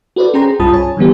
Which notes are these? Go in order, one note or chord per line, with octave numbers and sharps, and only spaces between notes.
F#4 A4 B4 C5 D5
C#4 G#4 C5 G5 A#5 C6
C2 G2 F4 A5 B5 D#6
C#5 G#5 A5
D3 E3 G3 B3 G4